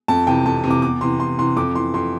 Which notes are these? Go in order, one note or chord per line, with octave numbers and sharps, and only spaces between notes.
F2 A5
C3 E3 G5
F2 A5
C3 E3
D6
E2 D6
C3 E3 C6
E2 C6
C3 E3 C6
F2 D6
E3 C6
F2 C6